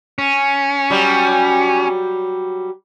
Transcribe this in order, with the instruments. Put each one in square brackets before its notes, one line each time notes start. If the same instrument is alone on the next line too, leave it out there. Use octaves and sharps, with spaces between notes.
[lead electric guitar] C#4
[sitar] F#3 G3